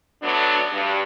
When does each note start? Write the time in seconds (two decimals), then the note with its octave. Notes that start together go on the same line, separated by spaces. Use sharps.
0.22 D3 F#3 A3 B3 D4
0.72 G2